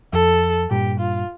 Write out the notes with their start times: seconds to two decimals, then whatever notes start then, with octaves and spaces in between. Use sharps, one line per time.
0.13 F2 A4
0.70 G2 A#2 G4
0.99 F4